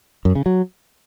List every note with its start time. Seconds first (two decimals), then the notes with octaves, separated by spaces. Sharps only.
0.25 F#2
0.35 C#3
0.46 F#3